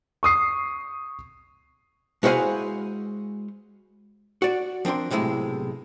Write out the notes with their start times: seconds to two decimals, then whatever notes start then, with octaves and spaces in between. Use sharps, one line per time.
0.23 C#6 D#6 C7
2.23 G#3 E4 F#4 C5 F5 G#5
4.42 F#4 D5
4.85 F3 C4 D4 A#4 C6
5.10 B1 A2 C3 G#3 E4